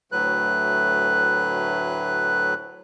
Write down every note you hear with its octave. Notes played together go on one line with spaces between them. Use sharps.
D2 A2 F#3 B4 F#6